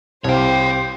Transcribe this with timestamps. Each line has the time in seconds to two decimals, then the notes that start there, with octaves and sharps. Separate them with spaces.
0.24 C2 G4 C5 C#5 F5 G5